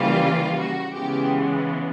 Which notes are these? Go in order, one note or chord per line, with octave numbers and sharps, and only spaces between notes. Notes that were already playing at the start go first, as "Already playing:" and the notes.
Already playing: C#3 E3 G3 A#3 F4
F#4
C#3 E3 G#3 B3 G4